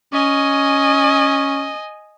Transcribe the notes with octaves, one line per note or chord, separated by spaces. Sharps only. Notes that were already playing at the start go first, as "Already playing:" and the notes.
C#4 D#5 G#5